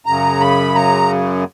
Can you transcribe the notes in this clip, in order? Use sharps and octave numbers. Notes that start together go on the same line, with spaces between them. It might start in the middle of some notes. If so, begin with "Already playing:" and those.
F#2 C#3 A#5
B5
A#5